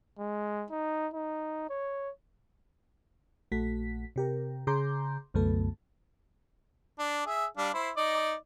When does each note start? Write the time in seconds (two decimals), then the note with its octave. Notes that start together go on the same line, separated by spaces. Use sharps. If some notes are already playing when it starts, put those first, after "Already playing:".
0.19 G#3
0.70 D#4
1.14 D#4
1.70 C#5
3.52 A#1 A3 F#4 B6
4.16 C3 G4 A#4
4.67 C#3 G#4 A#5 C6 D6 G6
5.34 C2 F#2 D3 A3 B3 A4
6.99 D4
7.26 G#4 E5
7.57 G3 D4 F5
7.74 E4 C5
7.97 D#4 D5 D#5